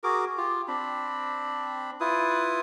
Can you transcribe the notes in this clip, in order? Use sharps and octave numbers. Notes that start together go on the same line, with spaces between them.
F#4 G#4 A#4 D6
F4 G4
C4 D4 B5
E4 F4 B4 D#6